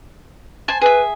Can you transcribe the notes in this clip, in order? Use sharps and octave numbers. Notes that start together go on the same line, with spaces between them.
C5 G#5 A5
G#4 B4 E5